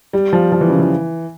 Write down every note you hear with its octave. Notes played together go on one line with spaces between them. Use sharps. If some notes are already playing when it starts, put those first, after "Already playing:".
G3
F3
F3
E3
C#3
E3